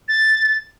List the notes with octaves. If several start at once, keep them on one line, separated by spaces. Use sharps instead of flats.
A6